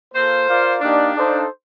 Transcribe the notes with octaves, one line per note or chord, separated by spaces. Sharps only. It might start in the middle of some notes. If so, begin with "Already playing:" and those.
A#3 F4 A4 C5
F4 A#4 D5 F5
A#3 D4 D#4 G4 D5 F5
D#4 A4 C5 F5